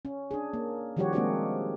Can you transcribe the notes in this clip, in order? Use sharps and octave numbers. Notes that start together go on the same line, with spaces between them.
C#4
D4 G#4
A#3
D#3 F3 G3 F#4 G4 C#5
G#3 A#3 C4 D4 F#4 G#4